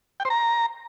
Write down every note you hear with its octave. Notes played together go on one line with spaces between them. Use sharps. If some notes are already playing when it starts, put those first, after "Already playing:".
G5
C5
A#5